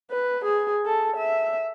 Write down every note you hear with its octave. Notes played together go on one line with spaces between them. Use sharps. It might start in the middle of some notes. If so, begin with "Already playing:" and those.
B4
G#4
A4
E5